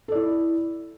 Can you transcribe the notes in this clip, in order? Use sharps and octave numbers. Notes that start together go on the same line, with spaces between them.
E4 A4 D5